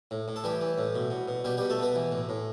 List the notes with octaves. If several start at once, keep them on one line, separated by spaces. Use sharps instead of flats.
A2
A2
A4
E3 G3 G4
E3
A2
B2
B2
B2
B2 G3 G4
B2 G3 G4
A3 A4
B2 B3 B4
E3
A2
A2